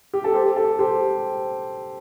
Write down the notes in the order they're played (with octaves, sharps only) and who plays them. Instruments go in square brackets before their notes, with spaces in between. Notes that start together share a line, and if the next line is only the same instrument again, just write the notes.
[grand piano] G4
A4
G4 C5
A4
G4 C5